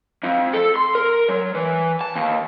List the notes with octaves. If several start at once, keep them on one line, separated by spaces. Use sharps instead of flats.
F2
A4
C6
A#4
F#3
E3
A5
D#2